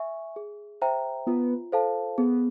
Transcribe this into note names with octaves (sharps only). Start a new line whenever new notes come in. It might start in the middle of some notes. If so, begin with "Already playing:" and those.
Already playing: E5 G#5 C#6
G#4
C5 E5 G5 A#5
B3 F4
A4 C5 F5 A5
B3 G#4